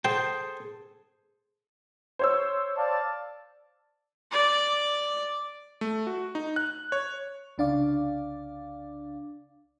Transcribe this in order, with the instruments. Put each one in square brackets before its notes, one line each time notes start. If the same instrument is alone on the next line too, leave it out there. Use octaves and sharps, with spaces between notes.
[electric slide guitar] G#4 A4 [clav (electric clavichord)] C5 [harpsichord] G5
[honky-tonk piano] C5 C#5 E6
[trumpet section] D5 F5 A5
[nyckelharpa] D5
[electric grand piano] A3
F#4
D#4
F#6
C#5
[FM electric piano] C2 C#3 D4 D5 F5 D6